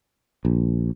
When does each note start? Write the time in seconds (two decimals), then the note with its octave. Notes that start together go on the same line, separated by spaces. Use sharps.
0.45 A#1